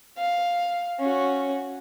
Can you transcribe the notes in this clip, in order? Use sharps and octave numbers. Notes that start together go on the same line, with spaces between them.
F5
C#4 F#4